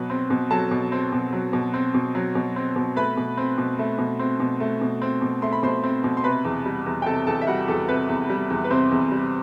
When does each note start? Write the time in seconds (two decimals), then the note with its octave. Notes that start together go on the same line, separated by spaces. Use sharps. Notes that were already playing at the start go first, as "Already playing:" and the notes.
Already playing: B2 F#3 B4
0.10 C4
0.30 B2
0.51 F#3 A4 A5
0.71 B2
0.92 C4
1.13 B2
1.33 F#3
1.53 B2
1.74 C4
1.94 B2
2.15 F#3
2.35 B2
2.56 C4
2.76 B2
2.96 A3 B4 B5
3.17 B2
3.37 C4
3.58 B2
3.79 A3
3.99 B2
4.19 C4
4.40 B2
4.60 A3
4.81 B2
5.02 C4
5.22 B2
5.42 A3 C6
5.52 B5
5.63 B2 C5 C6
5.84 C4
6.04 B2
6.17 C6
6.24 C3 B4 B5
6.45 E2
6.65 G3
6.86 E2
7.02 G5
7.06 C3 A4 A5
7.27 E2 A4 A5
7.41 E5
7.47 G3 F#4 F#5
7.68 E2 A4
7.88 C3 B4
8.09 E2
8.30 G3
8.50 E2
8.64 B4
8.70 C3 C4 C5
8.91 E2
9.11 G3